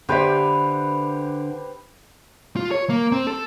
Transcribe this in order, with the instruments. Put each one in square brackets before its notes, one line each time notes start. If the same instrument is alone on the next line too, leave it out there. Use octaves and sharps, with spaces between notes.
[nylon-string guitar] D3 D5 E5 [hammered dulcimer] G4 B4 C5
[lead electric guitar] F4
C#5
A#3
C4
A4